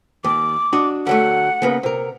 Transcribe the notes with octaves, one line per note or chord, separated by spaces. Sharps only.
D#2 D6
D4 F#4 D#5
D3 F#3 A3 F#5
C#3 A#3 B3
C3 A#4